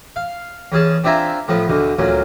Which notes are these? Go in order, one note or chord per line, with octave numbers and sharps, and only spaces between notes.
F5
E2 C#4 G#4 A5
C4 D4 F4 E5 G#5 A#5
A2 F3 B3
D2 B2 D3
D2 A#2 F#3 C#4